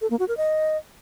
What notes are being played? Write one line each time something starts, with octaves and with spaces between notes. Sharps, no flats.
A4
A#3
F#4
A#4
D#5